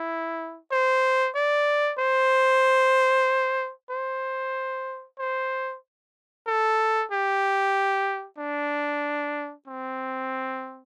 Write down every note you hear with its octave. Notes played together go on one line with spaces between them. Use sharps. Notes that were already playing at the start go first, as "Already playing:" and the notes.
Already playing: E4
C5
D5
C5
C5
C5
A4
G4
D4
C4